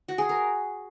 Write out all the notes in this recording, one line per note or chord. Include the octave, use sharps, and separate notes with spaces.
F#4
G#4
A#4